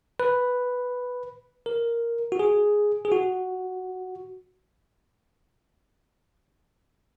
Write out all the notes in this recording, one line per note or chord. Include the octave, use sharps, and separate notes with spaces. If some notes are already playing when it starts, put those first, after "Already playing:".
B4
A#4
F#4
G#4
G#4
F#4